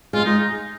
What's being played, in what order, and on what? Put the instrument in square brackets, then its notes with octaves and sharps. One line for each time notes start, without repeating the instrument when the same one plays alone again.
[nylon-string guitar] G#3 [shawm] F4
[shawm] D#4